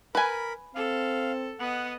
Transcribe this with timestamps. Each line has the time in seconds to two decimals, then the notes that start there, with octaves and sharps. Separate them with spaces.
0.15 A#4 B4 G#5 B5
0.75 C4 A4 F5
1.60 B3 D#5 F#5